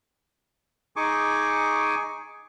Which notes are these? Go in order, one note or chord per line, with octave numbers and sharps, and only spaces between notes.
D#4 G#4 G#5 C#6 D6